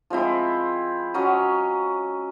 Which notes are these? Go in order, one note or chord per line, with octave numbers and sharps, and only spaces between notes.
F3 G#3 C4 E4
F#3 C#4 D#5